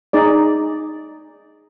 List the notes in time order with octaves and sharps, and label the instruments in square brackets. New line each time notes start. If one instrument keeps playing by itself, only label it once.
[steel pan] D#4 G#4 D5